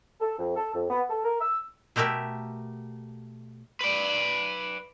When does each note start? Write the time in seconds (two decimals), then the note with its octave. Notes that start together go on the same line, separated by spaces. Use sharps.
0.20 A4
0.38 F2
0.56 A4
0.74 F2
0.89 B3
1.09 A4
1.24 A#4
1.41 E6
1.96 B2 A3 G4 A#4 E5
3.81 B4 D5